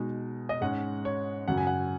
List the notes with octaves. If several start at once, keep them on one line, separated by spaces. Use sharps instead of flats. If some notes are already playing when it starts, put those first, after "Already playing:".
Already playing: B2 G#3 D#4
D#5
G#2 G#3 C#4 F#5
C#5
F#2 C#3 F#3 F#5
G#5
F#5